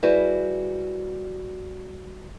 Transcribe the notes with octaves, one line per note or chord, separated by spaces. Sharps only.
G3 E4 F#4 G#4 B4 C5